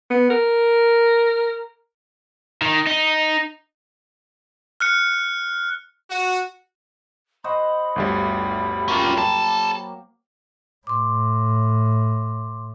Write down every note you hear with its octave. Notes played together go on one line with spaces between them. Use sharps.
B3
A#4
D#3
D#4
F6 F#6 C#7
F#4
F#4 C5 D#5 B5
G1 D2 G3
F#3 A#3 C#4 F4 G4
G#4 A5
A2 C6 D6